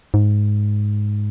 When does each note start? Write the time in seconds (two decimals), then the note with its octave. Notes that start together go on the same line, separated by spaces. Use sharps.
0.14 G#2